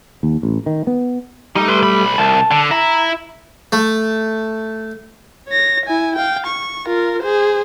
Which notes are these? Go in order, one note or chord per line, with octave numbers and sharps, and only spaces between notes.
D#2
A1
D#3
B3
G3 A3 D#4
B4 C6
B1 B5
C2 A5
D3
E4 A#5
A3
C#5 A#6
E4 G#5
F5 G5
C#6
F4 A#4
G#4 C5